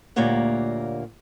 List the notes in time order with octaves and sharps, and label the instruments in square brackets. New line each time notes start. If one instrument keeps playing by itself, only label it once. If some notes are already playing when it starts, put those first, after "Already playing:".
[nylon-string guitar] D2 A#2 A#3 G4 C#5 F#5